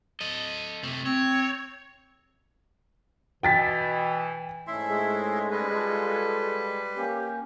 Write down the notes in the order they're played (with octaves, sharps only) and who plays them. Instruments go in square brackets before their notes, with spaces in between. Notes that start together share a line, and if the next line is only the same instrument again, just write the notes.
[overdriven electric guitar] A4 D#5
C3 A3
[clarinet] C4 [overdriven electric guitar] C#5
[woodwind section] B2 E3 [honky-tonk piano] G5 A6 B6
[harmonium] G#2 A3 C#4 [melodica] E4 E5 C6
[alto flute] G#3
[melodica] G3 B4
[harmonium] F4 A4
[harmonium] A#3 C#4 [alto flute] G4